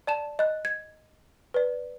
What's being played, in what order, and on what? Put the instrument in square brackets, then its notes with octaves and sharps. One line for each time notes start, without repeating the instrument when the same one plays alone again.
[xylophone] D5 A5 E7
D#5 F#6
G#6
B4 D5